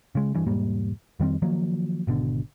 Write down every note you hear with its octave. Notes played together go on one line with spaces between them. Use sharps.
C#3 G#3
G2 E3
E1 G#2 G3 A#3
F2 D#3 G3 C4
D#3 F3 F#3 A#3
G#1 B2 D3